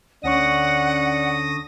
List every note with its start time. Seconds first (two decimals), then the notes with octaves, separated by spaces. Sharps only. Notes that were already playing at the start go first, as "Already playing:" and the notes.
0.24 D2 D3 C#4 D5 F#5 C#6 D#6 A#6